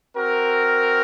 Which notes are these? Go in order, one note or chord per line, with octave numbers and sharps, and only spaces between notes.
C4 F#4 A#4